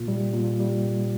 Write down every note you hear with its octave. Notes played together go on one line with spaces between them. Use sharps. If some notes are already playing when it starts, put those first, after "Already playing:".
Already playing: A#2
G3
A#2
G3